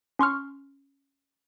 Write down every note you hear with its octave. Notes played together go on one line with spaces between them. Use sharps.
C#4 C6 C#6 F6